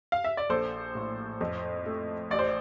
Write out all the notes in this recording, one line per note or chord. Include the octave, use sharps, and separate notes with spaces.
F5
E5
D5
A#1 A4 C5
A2
F2
A3
A1 D5
C5